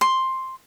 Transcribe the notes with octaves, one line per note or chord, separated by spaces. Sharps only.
C6